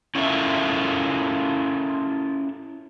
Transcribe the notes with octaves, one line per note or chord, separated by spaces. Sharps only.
C#4 E4 F4 A4 A#4 E5